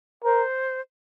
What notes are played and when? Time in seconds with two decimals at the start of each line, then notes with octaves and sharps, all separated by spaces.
0.24 A#4 C5